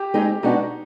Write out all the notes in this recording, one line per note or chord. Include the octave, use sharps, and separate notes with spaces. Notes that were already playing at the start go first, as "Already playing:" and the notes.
Already playing: G4
G#3 C4 D#4 G#4
B2 G#3 B3 D4 D#4 F#4